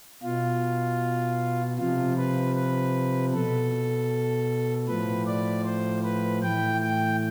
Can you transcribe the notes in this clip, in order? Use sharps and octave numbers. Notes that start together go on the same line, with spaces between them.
B2 F4
C3 F3 F4
B4
B4
B2 A4
A2 F3 B4
D5
C5
B4
A2 E3 G5
G5